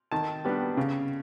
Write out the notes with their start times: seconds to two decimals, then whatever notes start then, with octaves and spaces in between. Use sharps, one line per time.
0.12 D#3 A5
0.45 G3 B3 D4
0.77 C#3